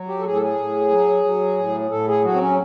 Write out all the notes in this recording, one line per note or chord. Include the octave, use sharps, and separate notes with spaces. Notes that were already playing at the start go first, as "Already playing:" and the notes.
Already playing: F#3
G4
A4
A2 G#4
A4
G#4
A2
F#3
F#3
A2
A2 A4
G#4
F#3 F#4
C4
C#4